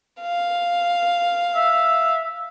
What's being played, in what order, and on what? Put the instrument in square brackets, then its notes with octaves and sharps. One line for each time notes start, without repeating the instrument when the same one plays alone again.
[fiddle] F5
[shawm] E5